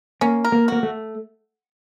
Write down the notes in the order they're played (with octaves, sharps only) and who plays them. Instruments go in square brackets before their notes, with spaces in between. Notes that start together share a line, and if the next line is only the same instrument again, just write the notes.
[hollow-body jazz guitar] A#3 [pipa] C#4
[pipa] A#4
[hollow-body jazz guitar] A#3
[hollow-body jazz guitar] A#3 [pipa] F#4
[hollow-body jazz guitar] A3